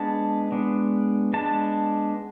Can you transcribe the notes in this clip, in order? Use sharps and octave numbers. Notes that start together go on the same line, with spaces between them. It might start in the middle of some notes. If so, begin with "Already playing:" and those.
Already playing: G#3 B3 D4 A5
G#3 B3 D4
G#3 B3 D4 A5